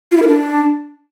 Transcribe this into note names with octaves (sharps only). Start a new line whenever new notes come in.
F4
E4
A#4
D4